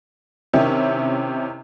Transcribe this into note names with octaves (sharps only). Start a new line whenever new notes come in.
C3 D#3 C#4 E4